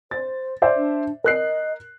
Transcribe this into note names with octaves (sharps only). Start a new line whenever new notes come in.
C5 A6
C5 D5 E5
D4
A#4 D#5 F#6 C7